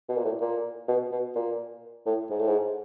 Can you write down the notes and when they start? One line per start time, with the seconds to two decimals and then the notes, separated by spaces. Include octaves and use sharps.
0.09 B2
0.17 A#2
0.25 A2
0.41 A#2
0.88 B2
1.12 B2
1.36 A#2
2.06 A2
2.30 G#2
2.39 A2
2.47 G#2